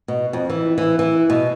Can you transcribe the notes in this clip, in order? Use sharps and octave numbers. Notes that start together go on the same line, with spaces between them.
B2
F2
E3
E3
E3
B2